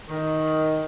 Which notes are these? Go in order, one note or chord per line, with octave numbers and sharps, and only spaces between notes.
D#3